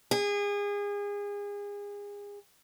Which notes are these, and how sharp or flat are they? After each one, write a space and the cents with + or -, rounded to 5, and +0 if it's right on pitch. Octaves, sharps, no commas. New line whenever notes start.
G#4 -30